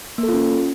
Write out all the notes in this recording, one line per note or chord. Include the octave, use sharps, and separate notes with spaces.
A#3
A4
F4
C#4